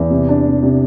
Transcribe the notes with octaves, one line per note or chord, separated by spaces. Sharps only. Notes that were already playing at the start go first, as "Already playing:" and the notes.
Already playing: E2
C3
D4
C3
C3